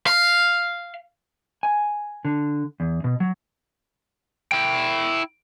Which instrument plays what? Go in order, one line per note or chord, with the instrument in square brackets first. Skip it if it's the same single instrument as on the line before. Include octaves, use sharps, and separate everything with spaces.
[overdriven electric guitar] F5
[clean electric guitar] G#5
D3
E2
B2
F#3
[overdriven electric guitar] E4 G5